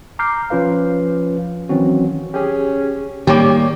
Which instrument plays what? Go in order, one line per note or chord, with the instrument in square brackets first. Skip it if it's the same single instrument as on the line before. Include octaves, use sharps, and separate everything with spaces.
[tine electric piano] A#5 D6 F6 G6 C7
F3 C#4 F4 B4 F5
D#3 E3 F#3 C4 C#4 F#4
[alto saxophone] C#4 [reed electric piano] G4 G#4
[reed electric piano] A2 C#5 D6 [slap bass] D#3 A#3 [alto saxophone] G3 [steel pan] G4